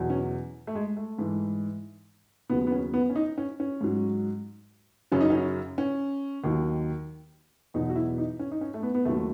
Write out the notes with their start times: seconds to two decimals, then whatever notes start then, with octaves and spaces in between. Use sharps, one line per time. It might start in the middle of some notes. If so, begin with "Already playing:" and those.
Already playing: E2 B2 F#3
0.10 C#4
0.67 A3
0.75 G#3
0.97 A3
1.19 G#2 E3
2.50 D#2 C#3 F#3 B3
2.67 B3
2.72 C#4
2.94 B3
3.10 C#4
3.16 D#4
3.38 C#4
3.60 C#4
3.81 G#2 F#3
5.11 F#2 C#3 F#3 C#4
5.21 D#4
5.30 C#4
5.78 C#4
6.44 D#2 D#3 F#3
7.74 E2 B2 F#3 D#4
7.90 F#4
7.96 E4
8.18 D#4
8.39 C#4
8.51 D#4
8.61 C#4
8.74 A3
8.83 B3
8.95 B3
9.05 D#2 C#3 F#3 A3